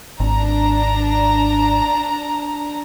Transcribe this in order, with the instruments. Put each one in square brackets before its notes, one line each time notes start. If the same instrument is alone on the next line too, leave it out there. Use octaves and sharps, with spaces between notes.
[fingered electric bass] G#1 [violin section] D4 A#5